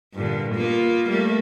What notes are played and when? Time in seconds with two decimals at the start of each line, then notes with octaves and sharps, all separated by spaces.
0.14 G2 A#2 D3
0.54 A#3 B3 F4
1.08 G3 A3 A#3